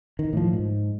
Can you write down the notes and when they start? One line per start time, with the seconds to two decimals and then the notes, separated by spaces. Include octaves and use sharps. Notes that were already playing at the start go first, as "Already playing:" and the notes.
0.19 D#3
0.33 A2 F3
0.53 G#2